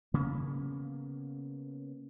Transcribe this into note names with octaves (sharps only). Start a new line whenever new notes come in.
C#3 A#3 B3 C#4